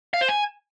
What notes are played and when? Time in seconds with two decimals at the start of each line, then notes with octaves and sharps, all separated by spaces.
0.14 F5
0.21 C5
0.28 G#5